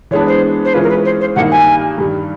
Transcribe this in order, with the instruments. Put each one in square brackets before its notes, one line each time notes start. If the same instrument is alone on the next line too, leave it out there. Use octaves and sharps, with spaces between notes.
[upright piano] E3 G#3 B3 D4 [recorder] C#5
[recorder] C5
C5
[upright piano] E3 G#3 C#4 F4 [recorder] B4
[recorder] A#4
B4
C5
C5
[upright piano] G2 D#3 G3 A#3 D#4 [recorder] F#5
[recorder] G#5
[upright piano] G2 D#3 G3